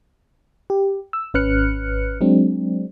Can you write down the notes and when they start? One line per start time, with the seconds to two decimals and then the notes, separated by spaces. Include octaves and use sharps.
0.70 G4
1.13 E6
1.34 G#1 C#4 B4 F6 F#6 C#7
2.21 F#3 G#3 C4 D4